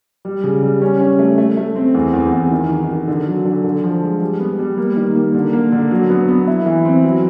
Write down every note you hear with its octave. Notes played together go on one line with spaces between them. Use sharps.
G3
C#3
G3
C#4
C#4
A3
A3
A3
C4
E2
E2
E2
D#3
D#3
D#3
D3
F#3
D3
D3
F3
G#3
G3
B3
G3
A#3
D#3
A#3
D3
A#3
D3
F#3
B3
B3
E4
E3
C4
F#3